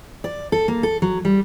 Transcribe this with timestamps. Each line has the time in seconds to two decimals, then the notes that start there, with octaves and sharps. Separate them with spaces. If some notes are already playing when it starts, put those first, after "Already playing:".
0.24 D5
0.52 A4
0.68 A#3
0.83 A4
1.02 F#3
1.25 G3